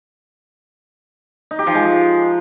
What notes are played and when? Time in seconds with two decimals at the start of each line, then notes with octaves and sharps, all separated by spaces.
1.51 D#4
1.59 G4
1.67 F3
1.75 G#3